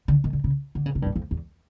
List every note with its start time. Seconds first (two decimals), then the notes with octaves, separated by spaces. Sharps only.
0.08 D3
0.24 D#3
0.33 D3
0.44 C#3
0.75 D3
0.86 C#3
0.95 C3
1.02 G2
1.06 G#2
1.16 F2
1.31 E2